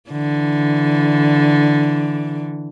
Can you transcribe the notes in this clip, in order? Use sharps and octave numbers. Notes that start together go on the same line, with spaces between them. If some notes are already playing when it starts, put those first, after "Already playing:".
D3 E3